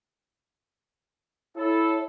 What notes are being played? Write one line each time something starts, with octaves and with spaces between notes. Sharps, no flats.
E4 A4 C#5